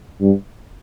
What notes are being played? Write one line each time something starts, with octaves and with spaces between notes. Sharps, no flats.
G2